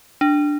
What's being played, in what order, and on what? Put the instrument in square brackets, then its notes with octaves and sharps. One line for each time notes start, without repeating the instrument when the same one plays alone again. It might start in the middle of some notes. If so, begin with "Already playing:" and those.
[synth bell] D4